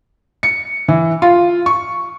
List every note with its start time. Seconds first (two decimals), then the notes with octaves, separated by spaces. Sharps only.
0.43 C#7
0.88 E3
1.22 F4
1.66 C#6